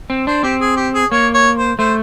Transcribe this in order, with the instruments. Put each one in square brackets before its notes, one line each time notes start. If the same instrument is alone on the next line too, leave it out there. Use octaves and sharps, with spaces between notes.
[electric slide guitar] C4
[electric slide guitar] D4 [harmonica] C5
[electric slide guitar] C4 [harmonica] G4
[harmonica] G#4
G4
G#4
[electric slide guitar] A#3 [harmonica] C#5
[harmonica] C#5
C5
[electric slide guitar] A3 [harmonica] C5